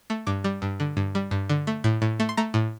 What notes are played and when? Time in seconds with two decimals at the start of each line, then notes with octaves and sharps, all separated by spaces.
0.10 A3
0.27 G2 D6
0.44 G3
0.62 G2
0.80 D3
0.97 G2
1.15 G3
1.31 G2
1.49 D3
1.67 A3
1.84 A2
2.02 A2
2.20 A3
2.29 C6
2.37 A3 A#5
2.54 A2